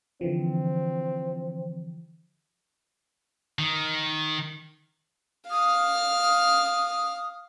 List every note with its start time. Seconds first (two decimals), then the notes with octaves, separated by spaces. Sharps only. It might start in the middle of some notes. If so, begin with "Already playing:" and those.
0.21 D3 E3 F3 C4
3.59 D#3
5.51 F5 D#6 F6